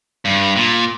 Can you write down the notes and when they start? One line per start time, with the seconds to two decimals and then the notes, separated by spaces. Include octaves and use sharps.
0.25 G2
0.56 A#2